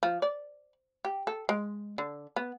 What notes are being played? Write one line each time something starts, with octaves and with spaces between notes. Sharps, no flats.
F3
D5
G4
A4
G#3
D3
B3